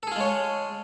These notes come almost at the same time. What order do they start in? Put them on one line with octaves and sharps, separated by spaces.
A4 G#4 F4 G#3 C#5